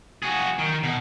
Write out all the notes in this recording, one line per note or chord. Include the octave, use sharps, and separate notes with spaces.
F#4 G#4
D#3
B2